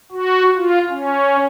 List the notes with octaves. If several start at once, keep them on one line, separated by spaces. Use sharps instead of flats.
F#4
F4
C#4